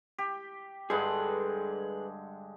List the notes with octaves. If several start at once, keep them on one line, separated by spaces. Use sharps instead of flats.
G4
G2 D3 G#3 G#4 B4